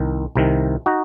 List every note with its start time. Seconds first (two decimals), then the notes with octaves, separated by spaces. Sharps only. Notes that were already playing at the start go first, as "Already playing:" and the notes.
Already playing: C2 D#3
0.36 C2 C3 D#3
0.86 D#4 F#4